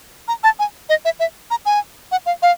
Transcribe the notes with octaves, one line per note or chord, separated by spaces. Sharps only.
A#5
A5
G#5
D#5
E5
E5
A#5
G#5
F#5
F5
F5